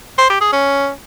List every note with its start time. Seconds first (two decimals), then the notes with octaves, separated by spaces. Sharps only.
0.18 C5
0.30 G4
0.41 G#4
0.52 C#4